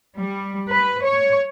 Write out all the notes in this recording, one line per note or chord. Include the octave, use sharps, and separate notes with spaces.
G3
B4
C#5